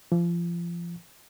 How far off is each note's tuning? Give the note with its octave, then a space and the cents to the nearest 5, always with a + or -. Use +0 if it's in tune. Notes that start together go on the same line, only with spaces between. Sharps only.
F3 -30